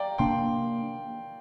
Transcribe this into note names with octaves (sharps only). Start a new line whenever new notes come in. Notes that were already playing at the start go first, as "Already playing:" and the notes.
Already playing: D5 F5 G5 A#5
C3 A#3 D4 G5 C6